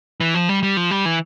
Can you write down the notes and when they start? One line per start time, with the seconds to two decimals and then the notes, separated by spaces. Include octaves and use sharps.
0.20 E3
0.34 F3
0.49 G3
0.63 G3
0.77 F3
0.91 G3
1.05 E3